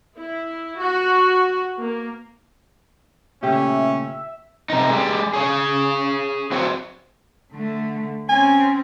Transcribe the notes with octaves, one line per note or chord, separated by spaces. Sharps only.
E4
F#4
A#3
A#2 C#3 A3 C#4 G4 E5
C3 D#4
G#3 G4
G#4 C#5
C4 F#4 C5 C#5
D3 A3
C4 C#4 G#5